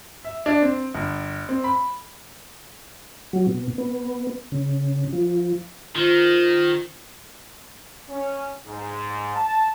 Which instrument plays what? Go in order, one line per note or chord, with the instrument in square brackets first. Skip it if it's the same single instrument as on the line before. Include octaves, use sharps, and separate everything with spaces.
[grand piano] E5
D4
C4
G1
C4
B5
[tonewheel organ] F#3
B2
B3
C#3
F3
[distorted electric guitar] D#3 [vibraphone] F4 C5
[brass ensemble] C#4
G#2
A5